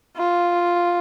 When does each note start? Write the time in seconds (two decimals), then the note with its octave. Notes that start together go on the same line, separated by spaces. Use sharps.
0.17 F4